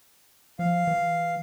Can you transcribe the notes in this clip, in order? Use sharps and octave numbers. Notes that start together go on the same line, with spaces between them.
F3 F5
E3